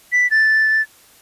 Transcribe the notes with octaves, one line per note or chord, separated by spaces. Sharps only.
B6
A6